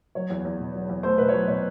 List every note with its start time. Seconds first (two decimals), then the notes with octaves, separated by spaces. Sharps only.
0.15 F#3 C#5
0.30 E2
0.45 E2
0.59 B2
0.74 F#3
0.89 E2
1.03 A3 C5
1.18 B2 B4
1.29 C#5
1.33 F#3 C5
1.48 B2 C#5